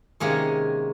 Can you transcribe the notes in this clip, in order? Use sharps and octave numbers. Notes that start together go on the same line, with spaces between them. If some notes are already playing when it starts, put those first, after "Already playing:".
C3 D#3 G#3 A#3 C#4